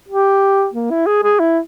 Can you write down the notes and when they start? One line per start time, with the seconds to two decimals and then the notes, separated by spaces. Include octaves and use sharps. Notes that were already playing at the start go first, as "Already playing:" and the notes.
0.08 G4
0.74 A#3
0.90 E4
1.07 G#4
1.23 G#4
1.40 E4